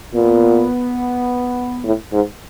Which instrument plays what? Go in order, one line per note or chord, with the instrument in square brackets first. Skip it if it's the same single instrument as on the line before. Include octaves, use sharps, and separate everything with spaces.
[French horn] A#2 [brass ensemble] B3
[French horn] A2
G#2